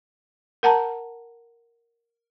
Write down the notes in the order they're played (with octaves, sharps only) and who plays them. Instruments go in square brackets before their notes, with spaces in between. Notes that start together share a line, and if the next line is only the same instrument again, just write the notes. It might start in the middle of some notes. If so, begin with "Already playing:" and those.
[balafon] A#4 F#5 A5 A#5